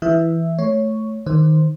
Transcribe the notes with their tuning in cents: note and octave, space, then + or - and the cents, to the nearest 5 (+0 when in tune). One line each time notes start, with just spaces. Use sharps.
E3 +0 E5 +0
A3 -10 C#5 +0
D#3 +0 C5 +0